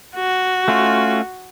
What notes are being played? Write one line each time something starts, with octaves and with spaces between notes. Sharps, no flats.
F#4
A3 C#4 F4